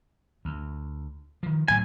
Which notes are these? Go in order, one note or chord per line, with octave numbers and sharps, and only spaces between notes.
D2
D#3 F3
D2 A2 F#3 G#5